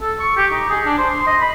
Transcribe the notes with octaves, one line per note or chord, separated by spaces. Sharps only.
A4
C#6
G4
D#4
G#4
D4
C5
C6
D#5
B5